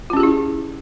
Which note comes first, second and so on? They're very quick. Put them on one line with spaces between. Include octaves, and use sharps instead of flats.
F4 C#4 G4 G#4 E4